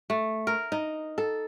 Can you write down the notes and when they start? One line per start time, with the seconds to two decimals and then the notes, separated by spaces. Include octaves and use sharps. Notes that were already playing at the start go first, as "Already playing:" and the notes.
0.10 A3
0.47 A#4
0.72 D#4
1.18 A4